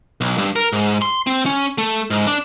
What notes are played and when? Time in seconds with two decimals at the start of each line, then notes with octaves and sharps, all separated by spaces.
0.21 B1
0.38 G2
0.56 A#4
0.73 G#2
1.02 C6
1.27 C4
1.46 C#4
1.78 A3
2.10 G#2
2.27 D4